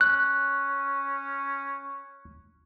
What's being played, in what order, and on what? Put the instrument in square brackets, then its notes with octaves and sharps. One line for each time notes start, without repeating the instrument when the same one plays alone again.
[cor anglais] C#4 [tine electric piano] F#6